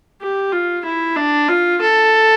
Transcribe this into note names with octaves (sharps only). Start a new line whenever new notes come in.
G4
F4
E4
D4
F4
A4